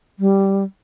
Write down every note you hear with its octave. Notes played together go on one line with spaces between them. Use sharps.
G3